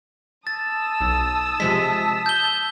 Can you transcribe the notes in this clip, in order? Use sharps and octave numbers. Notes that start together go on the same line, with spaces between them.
A5 D#6 E6 A6
B1
C3 F3 G#3 B6
G6 G7